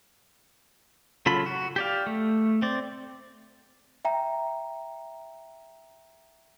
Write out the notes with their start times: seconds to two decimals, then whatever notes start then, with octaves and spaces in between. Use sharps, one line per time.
1.26 C#3 F#3 F4 A4 B5
1.46 F#4
1.76 G4 D5 F5
2.07 A3
2.62 C4 D5
4.05 E5 G5 A#5